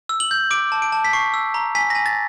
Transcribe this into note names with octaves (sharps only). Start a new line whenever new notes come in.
E6
F#7
G6
D6 D7
A5
D7
A5
B6
C#6 C7
E6
A#5
G#5 B6
G#5 A#6
A6